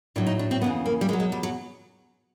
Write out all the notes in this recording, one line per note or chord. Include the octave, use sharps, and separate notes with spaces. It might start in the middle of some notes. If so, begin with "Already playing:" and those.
A2 F#3 D4
D#4
D4
C4
F2 C#3 E3 B3
A#3
G3
E2 B2 F#3 G#3
G#3
G3
F#3